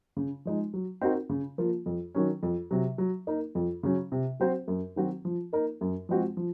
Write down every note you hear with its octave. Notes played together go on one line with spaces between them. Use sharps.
C#3
F3 G#3 D#4
F#3
C4 D#4 F#4 A#4
C#3
F3 A#3 F4
F2
D#3 F#3 C#4
F2
C3 F#3
F#3
A#3 D#4 A#4
F2
C#3 F#3 C#4
C3
F#3 C4 F#4 C5
F#2
D#3 F#3 C4 F#4
F3
A#3 D#4 A#4
F#2
F3 G#3 C4 F#4
F3